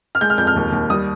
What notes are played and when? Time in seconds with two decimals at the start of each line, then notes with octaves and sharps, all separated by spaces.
0.15 F6
0.21 G#3 G6
0.30 F6
0.38 F2 G6
0.47 F6
0.56 D#2
0.72 D#2
0.90 G3 D#6